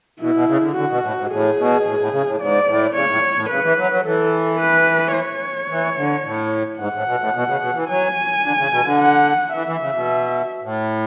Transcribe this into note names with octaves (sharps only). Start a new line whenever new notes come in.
B2 E4
B2
C#3
D3
D3 F#4
B2
A2
G#2
A2 G#4
B2
A2
A2
C#3
A2
G#2 D5
A2
C#3 C#5
A2
A2
C#3 B4
E3
F#3
F#3
E3 A4
B4
C#5
E3
D3
A2
G#2 F#5
A2
B2
A2
B2
C#3
B2
E3
F#3 G#5
D3
C#3
B2
D3
F#5
E3 E5
E3
C#3
B2
A2